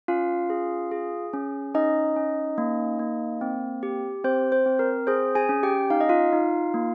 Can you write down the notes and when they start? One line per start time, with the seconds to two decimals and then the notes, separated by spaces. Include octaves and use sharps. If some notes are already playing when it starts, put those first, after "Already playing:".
0.08 C#4 F4 F5
0.50 G#4
0.91 G#4
1.33 C#4
1.74 C#4 D#4 D#5
2.16 C#4
2.58 A#3
2.99 A#3
3.41 C4
3.83 G4
4.24 C4 C5
4.52 C5
4.66 C4
4.79 A#4
5.07 G#4 C5
5.35 G#4 G#5
5.49 C#4
5.63 G4 G5
5.90 D#4 F5
6.01 D#5
6.09 F4 F5
6.32 D#4
6.74 A#3